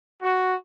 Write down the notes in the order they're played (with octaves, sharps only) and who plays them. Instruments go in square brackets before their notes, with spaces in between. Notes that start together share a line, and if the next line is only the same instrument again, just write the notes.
[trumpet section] F#4